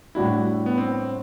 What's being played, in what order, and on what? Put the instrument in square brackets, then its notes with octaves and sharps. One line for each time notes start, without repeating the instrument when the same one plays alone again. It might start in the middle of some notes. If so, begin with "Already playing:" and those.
[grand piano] A2 G3 D4 F#4 [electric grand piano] E4
[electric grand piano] B3
C4